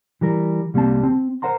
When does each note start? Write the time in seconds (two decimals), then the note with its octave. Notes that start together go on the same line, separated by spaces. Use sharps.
0.21 E3 G3 A#4
0.74 C2 G3 A#3 C4 A5
1.03 C4
1.42 A#4 C5 F#5 A#5 C6